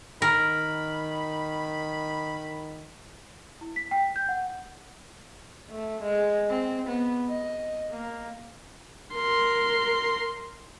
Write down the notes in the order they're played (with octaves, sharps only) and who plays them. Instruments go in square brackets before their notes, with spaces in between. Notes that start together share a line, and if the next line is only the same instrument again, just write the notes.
[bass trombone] D#3 [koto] A#4 [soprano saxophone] B5
[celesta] E4
B6
G5
G6
F#5
[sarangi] A3
G#3
C4
B3
D#5
A#3
[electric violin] A#4 C6